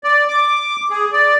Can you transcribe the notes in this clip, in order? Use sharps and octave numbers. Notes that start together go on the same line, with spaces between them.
D5
D6
G#4
D5